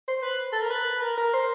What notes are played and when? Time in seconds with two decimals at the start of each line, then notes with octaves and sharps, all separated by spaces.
0.08 C5
0.23 B4
0.53 A4
0.61 A#4
0.70 B4
1.01 A#4
1.17 A#4
1.34 C5